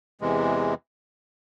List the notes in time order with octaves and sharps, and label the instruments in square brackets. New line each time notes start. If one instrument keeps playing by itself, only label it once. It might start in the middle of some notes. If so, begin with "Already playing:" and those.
[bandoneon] E2 C3 E3 G#3